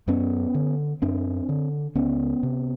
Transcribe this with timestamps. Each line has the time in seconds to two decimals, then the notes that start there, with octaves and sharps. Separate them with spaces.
0.08 F#2 B3 C#4
0.54 D3
1.02 F#2 C4 D4
1.49 D3
1.95 C#2 B3 C#4
2.43 C3